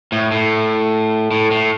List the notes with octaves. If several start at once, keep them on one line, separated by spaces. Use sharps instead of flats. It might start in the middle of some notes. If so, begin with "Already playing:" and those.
A2
A2
A2
A2